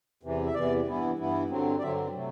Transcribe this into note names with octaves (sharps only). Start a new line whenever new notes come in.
E2 C3 E3
E5
E2 C3 E3 D5
G2 E3 B3 E4
G2 E3 B3 E4
G2 D3 F#3 C4
D5
G2 D3 F#3 C4 E5
C3 F#3 A3